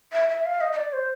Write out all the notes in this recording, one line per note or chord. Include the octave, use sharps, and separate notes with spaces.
E5
E5
F5
D#5
D#5
D5
C5